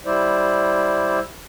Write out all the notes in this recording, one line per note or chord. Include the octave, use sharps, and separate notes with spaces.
G3 E4 C5 D5